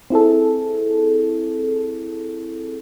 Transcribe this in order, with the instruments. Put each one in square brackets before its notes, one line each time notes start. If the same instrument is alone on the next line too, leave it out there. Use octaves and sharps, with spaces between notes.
[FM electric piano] C4 E4 G#4 A4